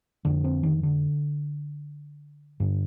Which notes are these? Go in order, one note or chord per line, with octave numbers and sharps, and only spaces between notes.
F2 D3
C4
D#3
D3
G2 D3